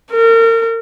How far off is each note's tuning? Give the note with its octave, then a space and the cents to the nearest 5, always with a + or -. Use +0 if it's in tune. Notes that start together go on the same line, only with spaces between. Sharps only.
A#4 -35